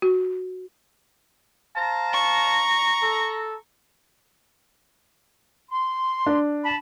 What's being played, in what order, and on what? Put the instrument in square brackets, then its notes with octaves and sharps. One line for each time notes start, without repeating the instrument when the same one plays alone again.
[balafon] F#4
[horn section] C5 F5 A5 [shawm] A#5
[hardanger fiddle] C#6
[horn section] A4
[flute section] C6
[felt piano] D4
[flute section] A5 B5